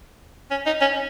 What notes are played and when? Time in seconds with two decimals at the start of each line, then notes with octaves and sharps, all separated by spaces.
0.51 C#4
0.66 D#4
0.81 C#4